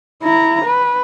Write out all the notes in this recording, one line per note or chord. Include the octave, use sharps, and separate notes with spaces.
E4 A#5
B4